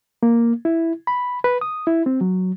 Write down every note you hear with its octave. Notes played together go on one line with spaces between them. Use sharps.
A#3
E4
B5
B4
D#6
E4
C4
F#3